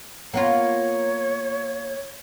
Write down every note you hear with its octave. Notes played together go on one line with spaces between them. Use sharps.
A#3 B3 F4 C#5